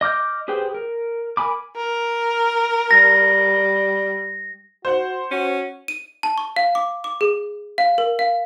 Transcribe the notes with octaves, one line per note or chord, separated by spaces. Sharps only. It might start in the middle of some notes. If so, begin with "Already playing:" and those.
D#5 D6 F6 G6
G4 G#4 B4 C5 G5
A#4
A#4 G#5 B5 D6
A#4
G3 A#6
F#4 C5 F#5
C#4 F#4
D#7
A5
C#6
F5
D6
D6
G#4
F5
A#4
F5